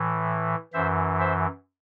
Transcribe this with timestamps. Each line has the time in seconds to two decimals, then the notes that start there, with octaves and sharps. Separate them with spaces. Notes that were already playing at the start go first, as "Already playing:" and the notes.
Already playing: A2 E3
0.73 F#2 E3 C5 E5
1.19 C5 E5